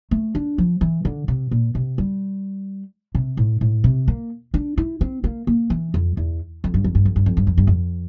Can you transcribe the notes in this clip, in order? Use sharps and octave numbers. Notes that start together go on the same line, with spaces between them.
A3
D4
F3
E3
D3
C3
A#2
C3
G3
C3
A2
A2
C3
A#3
D4
E4
C4
A#3
A#3
E3
F2
E2
F2
G2
F2
G2
F2
G2
F2
G2
F2
G2
F2